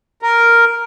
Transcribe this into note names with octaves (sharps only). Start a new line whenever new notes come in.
A#4